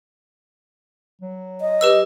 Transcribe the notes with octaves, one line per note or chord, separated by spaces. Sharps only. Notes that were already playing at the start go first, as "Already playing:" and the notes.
F#3
D#5
G4 B4 E6